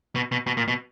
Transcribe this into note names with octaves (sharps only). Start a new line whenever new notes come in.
B2
B2
B2
A#2
B2